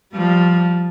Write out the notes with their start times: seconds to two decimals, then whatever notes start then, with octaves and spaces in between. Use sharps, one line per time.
0.14 F3 G3